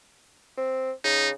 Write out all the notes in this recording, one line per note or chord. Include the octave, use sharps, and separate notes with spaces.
C4
C#3 D#4